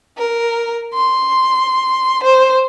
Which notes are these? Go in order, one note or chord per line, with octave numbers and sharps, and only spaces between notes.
A#4
C6
C5